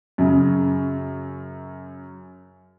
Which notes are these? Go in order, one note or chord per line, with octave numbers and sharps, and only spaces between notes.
F#2 C#3